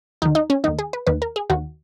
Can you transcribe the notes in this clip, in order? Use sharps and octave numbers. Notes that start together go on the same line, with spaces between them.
D#2 D#3 D#4
D#4
C#4
D#2 D#3 D#4
G#4
B4
D#2 D#3 B4
A#4
G#4
D#2 D#3 F#4